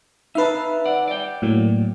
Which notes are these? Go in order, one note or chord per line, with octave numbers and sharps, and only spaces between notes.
D#4 B4 E5 F5 A5
D5 F#5
D5 G5
A2 F#3 A#3